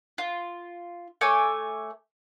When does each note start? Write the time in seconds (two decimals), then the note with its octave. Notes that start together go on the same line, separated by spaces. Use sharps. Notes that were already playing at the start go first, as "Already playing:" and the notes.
0.18 F4
1.21 A3 C#5 G#5 D6